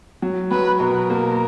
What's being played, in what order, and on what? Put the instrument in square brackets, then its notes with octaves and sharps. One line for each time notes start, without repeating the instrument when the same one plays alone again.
[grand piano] F#3
[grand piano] F#3 [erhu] B4
[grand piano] B2 [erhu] A#4
[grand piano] A#3